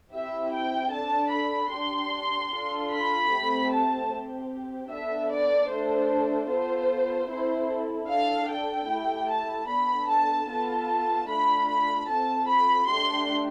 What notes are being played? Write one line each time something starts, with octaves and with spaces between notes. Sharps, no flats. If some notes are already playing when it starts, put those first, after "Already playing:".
C4 E4 G4 E5
G5
D4 A4 A5
B5
D4 G4 C6
D4 F4 A4
B5
A3 C4 G4
A5
C4 G4
B3 D4 A4 E5
D5
A3 D4 A4 C5
B3 F4 A4 C5
C4 E4 A4 C5
D4 A4 F5
G5
A3 E4 G4
A5
B3 D4 A4 B5
A5
B3 F4 A4 A5
A3 D4 F4 B5
B5
C4 F4 A4 A5
B5
A3 D4 G4 C6